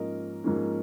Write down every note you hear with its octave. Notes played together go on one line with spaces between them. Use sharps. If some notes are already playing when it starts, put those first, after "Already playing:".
Already playing: G#2 F3 A#3 C#4 A#4 D#5
G#2 F3 A#3 C#4